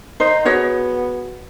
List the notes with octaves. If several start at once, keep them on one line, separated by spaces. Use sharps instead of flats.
D#4 C5
B3 F#4 G#4 C#5